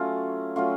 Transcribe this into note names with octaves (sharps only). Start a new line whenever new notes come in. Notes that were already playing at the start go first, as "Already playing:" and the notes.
Already playing: F#3 A3 C#4 F4
F#3 A3 C#4 F4